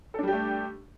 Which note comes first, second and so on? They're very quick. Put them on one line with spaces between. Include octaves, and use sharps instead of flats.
A4 D4 G3 G4 A3